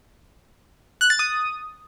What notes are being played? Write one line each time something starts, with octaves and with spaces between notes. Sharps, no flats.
F#6
A6
D#6